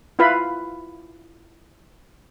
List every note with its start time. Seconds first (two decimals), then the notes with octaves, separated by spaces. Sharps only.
0.19 E4 F4 B4 F5 B5